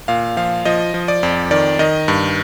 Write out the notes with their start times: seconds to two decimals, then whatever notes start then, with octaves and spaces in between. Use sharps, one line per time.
0.08 A#2 F5
0.37 F3 F5
0.65 F3 D#5
0.94 F3
1.08 D5
1.23 F2
1.51 D#3 D5
1.79 D#3 D#5
2.08 G2